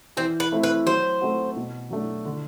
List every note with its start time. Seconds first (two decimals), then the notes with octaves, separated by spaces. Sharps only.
0.17 E3 C4
0.40 B4
0.52 A3 C4 E4
0.63 B4
0.86 F#3 C5
1.21 A3 C4 F#4
1.56 B2
1.90 F#3 A3 D4
2.25 D3